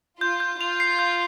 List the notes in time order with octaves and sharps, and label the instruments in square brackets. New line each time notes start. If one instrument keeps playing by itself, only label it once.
[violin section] F4 [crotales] G6
[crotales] G6
[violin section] F4 [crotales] F7
[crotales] C7
G6